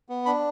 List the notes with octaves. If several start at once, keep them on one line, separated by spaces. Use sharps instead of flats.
B3
D4 B5